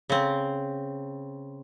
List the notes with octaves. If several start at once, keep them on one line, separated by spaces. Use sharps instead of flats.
C#3 C4